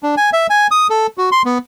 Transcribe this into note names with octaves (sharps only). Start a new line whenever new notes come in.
D4
G#5
E5
G#5
D#6
A4
F#4
C6
B3